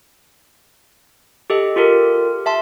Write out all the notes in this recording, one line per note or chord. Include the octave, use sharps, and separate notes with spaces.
G4 A4 D#5
F4 G4 A4 A#4
E5 A5 C6